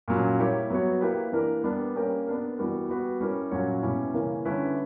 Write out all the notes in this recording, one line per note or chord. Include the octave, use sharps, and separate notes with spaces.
A#2 F#3 C#4
G3 A#3 E4 G4 C#5
F#3 B3 F#4 C#5
A#3 E4 G4 B4
E3 A#3 D4 A#4
G3 B3 D4 A#4
A#3 C#4 G4 A#4 C#5
B3 D4 A#4
E3 G3 B3 F#4 A#4
G3 B3 F#4 B4
G3 C#4 E4 A#4
A#2 F#3 C#4 F#4 C#5
B2 G3 C#4 E4
C#3 E3 A#3 C#4
D3 G3 C#4 E4 B4